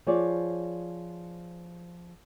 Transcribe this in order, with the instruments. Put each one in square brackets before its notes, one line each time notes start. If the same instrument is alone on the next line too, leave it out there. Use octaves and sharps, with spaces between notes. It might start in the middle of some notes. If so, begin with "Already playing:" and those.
[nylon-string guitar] F3 G#4 C#5 D5